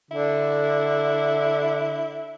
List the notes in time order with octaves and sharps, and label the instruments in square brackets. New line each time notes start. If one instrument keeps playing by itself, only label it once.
[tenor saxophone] D3 [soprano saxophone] E4